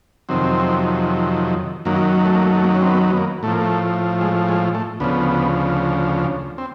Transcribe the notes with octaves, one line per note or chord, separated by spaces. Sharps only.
F2 C3 D#3 F#3 C4
F#2 D#3 F#3 A#3
A3
A#3
A3
A3
A#3
C#4
C4
B3
B3
A#3
A2 F3 A3 A#3
A3
G#3
G#3
A3
D2 C#3 F3 B3
C4